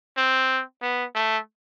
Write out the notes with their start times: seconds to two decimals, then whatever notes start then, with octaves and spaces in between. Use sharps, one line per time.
0.17 C4
0.82 B3
1.15 A3